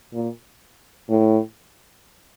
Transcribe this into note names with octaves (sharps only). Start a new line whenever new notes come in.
A#2
A2